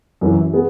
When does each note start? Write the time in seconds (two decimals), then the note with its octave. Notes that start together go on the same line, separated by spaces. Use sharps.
0.21 F#2 E3 C#4 E4
0.53 B3 G#4